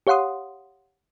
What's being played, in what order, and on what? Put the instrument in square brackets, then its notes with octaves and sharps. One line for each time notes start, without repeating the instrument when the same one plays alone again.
[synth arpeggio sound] G4 C#5 F5 F#5 C6 D#6